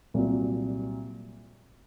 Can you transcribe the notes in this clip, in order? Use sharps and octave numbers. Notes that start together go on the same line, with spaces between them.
C2 A#2 F#3